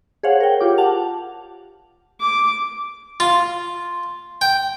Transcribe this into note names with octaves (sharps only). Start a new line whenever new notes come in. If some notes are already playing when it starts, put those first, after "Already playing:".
G#4 C5 C#5 F5 F#5
A#4 G5
F4 G4 D6
F#5 A5 F7
D6
F4
G5